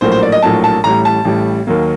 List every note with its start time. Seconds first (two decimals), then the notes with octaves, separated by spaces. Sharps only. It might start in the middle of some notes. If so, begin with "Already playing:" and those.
0.01 A#1 A2 F#3 A#3 C5
0.12 C5
0.23 D5
0.32 D#5
0.42 A#1 A2 F#3 A#3 A5
0.64 A5
0.84 A1 A2 G3 A#5
1.05 A5
1.25 A1 A2 G3
1.67 D#2 D#3 F#3 A#3